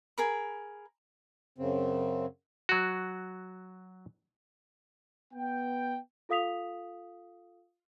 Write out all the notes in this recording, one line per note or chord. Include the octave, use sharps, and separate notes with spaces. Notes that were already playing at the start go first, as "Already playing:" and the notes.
G#4 A#4 B5
F#2 C#3 C4
F#3 F#4
B3 G5
F4 A4 F5 D#6 B6 F7